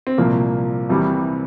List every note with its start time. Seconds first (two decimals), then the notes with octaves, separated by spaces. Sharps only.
0.07 C4
0.18 C2 A#2 F3 A#3
0.89 C2 C3 E3 G3